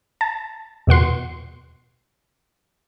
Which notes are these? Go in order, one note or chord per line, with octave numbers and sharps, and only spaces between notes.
A5
E2 B2 F#5 C6